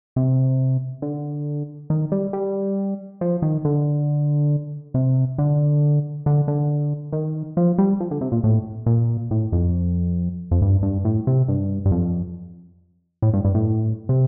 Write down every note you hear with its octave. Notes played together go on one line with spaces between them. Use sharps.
C3
D3
D#3
G3
G3
F3
D#3
D3
C3
D3
D3
D3
D#3
F3
G3
F3
D3
C3
A#2
A2
A#2
A2
F2
F2
G2
G2
A2
C3
G2
G2
F2
A2
G2
G2
A2
C3